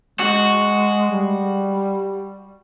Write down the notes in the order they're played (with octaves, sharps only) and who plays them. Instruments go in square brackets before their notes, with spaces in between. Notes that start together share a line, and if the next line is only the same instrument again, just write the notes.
[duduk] G#3 [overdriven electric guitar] F#4
[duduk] G3